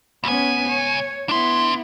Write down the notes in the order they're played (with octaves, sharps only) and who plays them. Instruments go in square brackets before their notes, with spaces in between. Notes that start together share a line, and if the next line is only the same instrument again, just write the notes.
[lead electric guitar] C#2 G#5 [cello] B3 C#4
[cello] C#5
[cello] B3 E4 [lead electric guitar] D4 C6